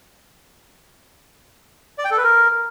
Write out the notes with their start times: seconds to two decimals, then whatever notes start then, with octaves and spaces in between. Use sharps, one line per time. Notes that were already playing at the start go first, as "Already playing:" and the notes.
1.98 D5
2.05 G5
2.11 A4
2.17 B4
2.24 A#4